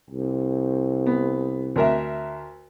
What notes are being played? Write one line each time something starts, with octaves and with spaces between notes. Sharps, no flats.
C2
B3
D2 A#4 E5